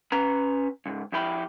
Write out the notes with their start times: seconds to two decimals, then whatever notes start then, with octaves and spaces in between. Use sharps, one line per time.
0.12 C#4 B4 A#5
0.86 C#2 G#2
1.12 F2 E4 G4 B5